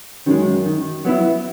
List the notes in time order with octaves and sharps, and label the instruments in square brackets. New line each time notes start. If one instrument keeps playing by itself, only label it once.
[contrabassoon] F#2 [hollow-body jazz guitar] D#3 G#3
[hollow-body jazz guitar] D#3
F#3 B3 E4